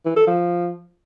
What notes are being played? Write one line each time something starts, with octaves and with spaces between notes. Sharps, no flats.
E3
A4
F3